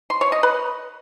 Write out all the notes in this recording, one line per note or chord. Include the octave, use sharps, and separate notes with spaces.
C6
C#5
D#5
B4